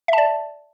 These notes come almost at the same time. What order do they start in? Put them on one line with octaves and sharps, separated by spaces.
E5 A5 D5